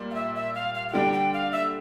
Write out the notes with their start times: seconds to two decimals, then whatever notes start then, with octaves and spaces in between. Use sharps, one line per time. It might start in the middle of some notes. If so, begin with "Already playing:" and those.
Already playing: A#2 G3
0.11 F5
0.15 E5
0.35 E5
0.55 F5
0.75 F5
0.88 F5
0.93 D3 G3 D4 G5
1.13 G5
1.33 F5
1.52 E5